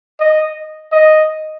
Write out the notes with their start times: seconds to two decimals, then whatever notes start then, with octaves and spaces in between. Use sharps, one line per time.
0.20 D#5
0.92 D#5